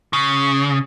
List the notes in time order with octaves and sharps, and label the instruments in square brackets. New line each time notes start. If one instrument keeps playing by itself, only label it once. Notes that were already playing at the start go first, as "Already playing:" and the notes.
[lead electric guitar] C#3